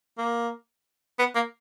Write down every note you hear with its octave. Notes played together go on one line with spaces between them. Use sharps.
A#3
B3
A#3